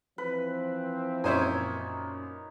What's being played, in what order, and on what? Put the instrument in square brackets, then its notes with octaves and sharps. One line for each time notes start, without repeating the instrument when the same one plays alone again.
[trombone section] E3 F3 C4 [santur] B4
[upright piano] F#2 A#2 [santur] D#4 C#5 [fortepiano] E4 C5 G#5